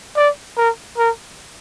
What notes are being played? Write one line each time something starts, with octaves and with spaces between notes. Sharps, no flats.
D5
A#4
A#4